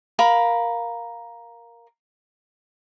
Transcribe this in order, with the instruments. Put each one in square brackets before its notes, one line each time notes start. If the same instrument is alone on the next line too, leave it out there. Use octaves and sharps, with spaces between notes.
[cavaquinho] A#4 F5 B5